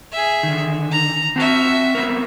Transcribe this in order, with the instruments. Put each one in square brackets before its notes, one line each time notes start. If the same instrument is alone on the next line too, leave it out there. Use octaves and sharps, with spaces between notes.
[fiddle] G#4 E5
[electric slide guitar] D3 D#3
[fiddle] A#5
[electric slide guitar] C4 A5 [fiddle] F#4 E5
[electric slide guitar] B3 C4 A#4